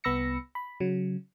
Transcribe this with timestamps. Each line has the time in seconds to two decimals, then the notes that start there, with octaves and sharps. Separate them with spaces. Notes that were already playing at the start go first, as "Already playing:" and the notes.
0.04 C2 B3 B5 E6 A#6 C#7
0.55 B5
0.80 C#3 F#3